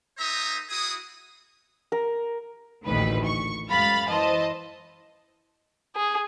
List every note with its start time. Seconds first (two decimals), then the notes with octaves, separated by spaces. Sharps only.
0.18 A#3 D#4 C5 E5 A#5 D#6
0.70 E4 F#4 G#4 D#6
1.92 A#4
2.86 A1 D2 A#2 D#3 B4
3.25 C#6
3.68 F#2 G#3 F5 B5 A6
4.08 E3 C5 D#5 A5
5.96 G#4